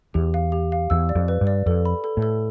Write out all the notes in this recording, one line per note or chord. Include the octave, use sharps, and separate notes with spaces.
E2 G4
F5
G4
F5
E2 E6
D5
F2
B4
G2
D5
F2 A4
B5
A4
A2
A4